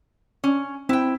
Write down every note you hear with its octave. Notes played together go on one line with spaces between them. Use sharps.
C#4
C4 E4 G5